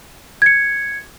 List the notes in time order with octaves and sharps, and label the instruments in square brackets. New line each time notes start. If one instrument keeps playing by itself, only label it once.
[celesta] G#6 C#7